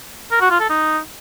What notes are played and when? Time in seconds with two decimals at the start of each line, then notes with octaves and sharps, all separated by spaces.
0.31 A#4
0.41 F#4
0.50 F4
0.60 A4
0.69 D#4